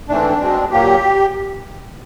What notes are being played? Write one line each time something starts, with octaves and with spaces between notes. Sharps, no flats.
G#2 E3 A3 C4 D4
B2 G#3 C4
A#2 F#3 A#3 G4